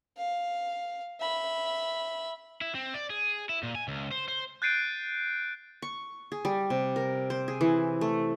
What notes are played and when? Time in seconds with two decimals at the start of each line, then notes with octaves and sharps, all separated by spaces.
0.17 F5
1.21 E5 B5
2.61 E4
2.75 C4
2.94 D5
3.10 G#4
3.49 E4
3.63 A#2
3.75 G#5
3.88 C#2
4.11 C5
4.28 C5
4.62 F#6 G6 A6 C7 D7 D#7
5.82 C#6
6.32 G#4
6.45 G3
6.70 C3
6.96 A#4
7.30 C5
7.48 G#4
7.61 E3
8.01 A3